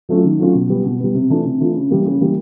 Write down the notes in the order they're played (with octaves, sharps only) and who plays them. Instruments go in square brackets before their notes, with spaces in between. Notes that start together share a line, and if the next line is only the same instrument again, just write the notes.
[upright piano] F#3 A3 C#4 F4
D#3
F#3 A3 C#4 F4
B2
G3 B3
B2
G3 B3
C3
E3 A3 D4 F4
C3
E3 A3 D4 F4
C#3
E3 G3 A#3
C#3
E3 G3 A#3